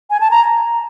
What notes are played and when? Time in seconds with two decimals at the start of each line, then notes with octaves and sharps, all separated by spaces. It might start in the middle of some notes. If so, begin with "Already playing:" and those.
0.10 G#5
0.20 A5
0.31 A#5